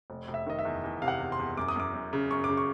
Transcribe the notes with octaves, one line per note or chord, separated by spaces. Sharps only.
F1
F1
E5
D#3 D#5
E5
E2
E2
C3 F5
F#5
E2
C6
E2
F#2 D6
D#6
F#2 D6
F#2
C#3
F#2 C#6
C#3 D6
C#6